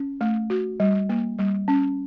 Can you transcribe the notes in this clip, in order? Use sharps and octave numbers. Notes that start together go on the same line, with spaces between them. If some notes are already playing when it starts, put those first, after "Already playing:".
Already playing: C#4
A3
F#4
G3
A#3
G3
C#4